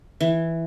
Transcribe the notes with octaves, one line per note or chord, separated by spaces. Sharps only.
E3